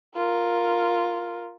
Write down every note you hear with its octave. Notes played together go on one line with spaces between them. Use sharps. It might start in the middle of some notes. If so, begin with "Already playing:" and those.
F4 A#4